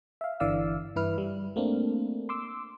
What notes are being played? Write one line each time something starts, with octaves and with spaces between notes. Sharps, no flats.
E5 F5
G1 D3 E3 D5 F5 E6
G2 E3 E4 B4 F6
G3
A3 A#3 C4 D4
C6 D6 E6